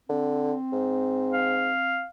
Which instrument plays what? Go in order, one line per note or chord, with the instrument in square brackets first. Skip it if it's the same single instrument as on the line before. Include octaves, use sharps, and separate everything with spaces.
[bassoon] D3 [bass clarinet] C4
[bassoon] G#2
[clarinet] F5